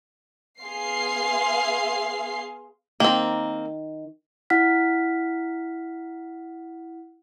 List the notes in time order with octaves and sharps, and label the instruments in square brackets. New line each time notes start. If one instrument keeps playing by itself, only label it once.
[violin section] B3 G#4 F5 C6 C7
[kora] D#3 [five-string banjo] A#3 C4
[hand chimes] E4 F#5 F6 B6